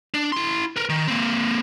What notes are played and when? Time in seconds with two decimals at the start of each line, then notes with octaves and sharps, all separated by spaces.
0.14 D4
0.32 E4 C6
0.76 A#4 B4
0.89 D#3
1.08 A#3 C4